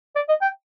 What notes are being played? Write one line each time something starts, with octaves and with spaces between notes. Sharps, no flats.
D5
D#5
G5